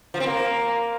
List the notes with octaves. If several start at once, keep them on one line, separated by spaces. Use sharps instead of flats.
F3
C4
A#3